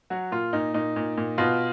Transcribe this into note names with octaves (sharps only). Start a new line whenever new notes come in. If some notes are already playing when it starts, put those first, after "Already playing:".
F#3 F#4
A#2 F4
A#2 D#4
A#2 D#4
A#2
A#2
B2 F4